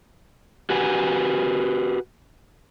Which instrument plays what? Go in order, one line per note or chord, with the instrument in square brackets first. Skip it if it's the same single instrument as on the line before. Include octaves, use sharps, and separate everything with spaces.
[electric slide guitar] F#4 G4 B4 G#5